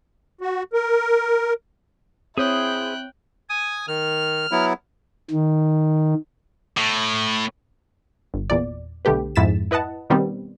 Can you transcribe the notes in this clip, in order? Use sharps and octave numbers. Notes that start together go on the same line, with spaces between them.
F#4
A#4
C4 E4 G#4 C5 C#5 G5 D#6 F#6
G#5 D#6
D#3 F6
F#3 B3 E4
D#3
A2
G1
E2 A#2 D5
B1 D3 A3 G4 B4
F2 G#2 E4 A6 B6 E7
E4 B4 D#5 F#5 A5
B2 D#3 G3 B3 C4